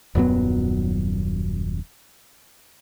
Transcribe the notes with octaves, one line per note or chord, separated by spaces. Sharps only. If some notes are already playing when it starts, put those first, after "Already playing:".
D#1 F#2 F#3 B3